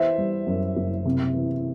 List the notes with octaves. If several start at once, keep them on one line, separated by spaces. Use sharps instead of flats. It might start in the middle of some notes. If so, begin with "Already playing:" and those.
Already playing: E3 C5 E5
G3
F#2
F#1
C3
E3